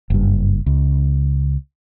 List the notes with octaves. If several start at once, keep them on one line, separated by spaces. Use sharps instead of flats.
F#1 G2
C#2